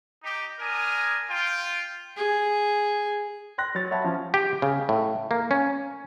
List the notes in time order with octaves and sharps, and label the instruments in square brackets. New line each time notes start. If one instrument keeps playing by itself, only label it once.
[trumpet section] D#4 G4
D4 A#4 G#5 D#6
F4 G5
[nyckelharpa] G#4
[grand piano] G5 C6 F#6 A#6
F#3 C#5 A6
C#5 E5 F#5 A5 B5
F3 C#4
[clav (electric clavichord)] G4
C#3
A2
A#3
C#4